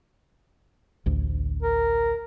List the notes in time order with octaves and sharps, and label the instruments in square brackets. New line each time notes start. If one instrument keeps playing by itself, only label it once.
[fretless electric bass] A1 D2
[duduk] A#4